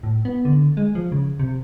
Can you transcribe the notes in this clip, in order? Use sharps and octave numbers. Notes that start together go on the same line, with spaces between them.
A2
B3
D3
G#3
F3
C#3
C3